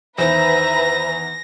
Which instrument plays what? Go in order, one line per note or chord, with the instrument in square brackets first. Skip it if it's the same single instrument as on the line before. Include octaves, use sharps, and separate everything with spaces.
[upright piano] E2 D#3 [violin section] B4 E5 A#5 [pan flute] C5 [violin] A#6